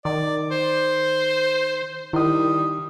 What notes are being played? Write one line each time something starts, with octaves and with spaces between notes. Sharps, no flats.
D#3 D5
C5
D#3 G3 E4 D#6